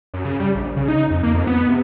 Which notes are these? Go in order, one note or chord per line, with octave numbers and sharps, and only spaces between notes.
F#2
C#3
G3
A#1
C#3
D#4
F2
A#3
F2
B3
C3